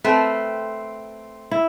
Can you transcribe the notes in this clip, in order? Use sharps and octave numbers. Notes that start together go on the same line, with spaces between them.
A3 C4 B4
E4